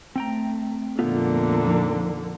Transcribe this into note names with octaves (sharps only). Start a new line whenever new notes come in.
A3 C4 G5 A#5
F2 A#2 D3 A3 B3 F4
F3 D#4